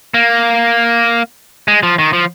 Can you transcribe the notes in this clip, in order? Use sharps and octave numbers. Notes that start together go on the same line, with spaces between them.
A#3
G#3
F3
D#3
F3